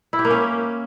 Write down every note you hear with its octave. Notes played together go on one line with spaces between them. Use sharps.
E4
G4
A#3
C#4